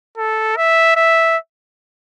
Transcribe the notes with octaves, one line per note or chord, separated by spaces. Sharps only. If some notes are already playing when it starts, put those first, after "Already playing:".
A4
E5
E5